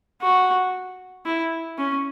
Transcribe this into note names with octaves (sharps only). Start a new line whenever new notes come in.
F#4
E4
C#4